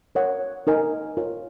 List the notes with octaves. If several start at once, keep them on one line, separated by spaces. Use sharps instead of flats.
A#4 C#5 F#5
D#4 A#4 D#5 G#5
F4 A#4 C#5